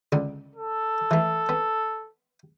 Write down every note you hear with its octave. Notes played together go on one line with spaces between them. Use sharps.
C#2 D3
A4
E3 A3
B3